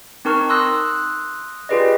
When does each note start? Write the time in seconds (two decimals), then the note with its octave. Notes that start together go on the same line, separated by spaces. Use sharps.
0.25 C4 D#4 A#4 A5 C#6 F6
0.49 C6 D#6 E6 F#6 A#6
1.69 F4 G4 G#4 B4 D5 D#5